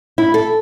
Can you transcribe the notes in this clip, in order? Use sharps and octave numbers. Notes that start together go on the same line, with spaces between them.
E4
A4